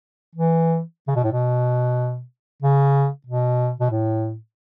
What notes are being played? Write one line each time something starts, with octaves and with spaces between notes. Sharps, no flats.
E3
C#3
B2
A2
B2
C#3
B2
B2
A2